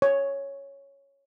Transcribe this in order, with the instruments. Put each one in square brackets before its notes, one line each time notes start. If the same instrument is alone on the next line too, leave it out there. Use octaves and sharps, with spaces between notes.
[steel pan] C#5